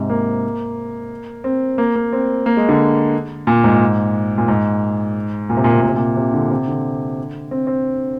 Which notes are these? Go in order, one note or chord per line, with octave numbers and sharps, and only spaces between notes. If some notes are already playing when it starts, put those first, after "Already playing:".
Already playing: G#2 C3
A#3
C4
A#3
A#3
C4
A#3
G#3
D3
A#2
G#2
A#2
G#2
A#2
C3
A#2
C3
A#2
C3
A#2
C3
D3
C3
D3
C4
C4